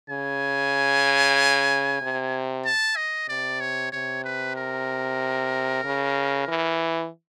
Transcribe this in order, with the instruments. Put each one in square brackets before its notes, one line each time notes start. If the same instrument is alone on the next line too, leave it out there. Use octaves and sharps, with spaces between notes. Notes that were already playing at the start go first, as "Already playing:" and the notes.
[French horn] C#3 [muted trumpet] G#5
[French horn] C3
[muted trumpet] A5
D#5
[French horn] C3 [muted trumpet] D5
[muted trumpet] C#5
[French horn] C3 [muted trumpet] C#5
[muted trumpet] B4
A#4
[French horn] C#3
E3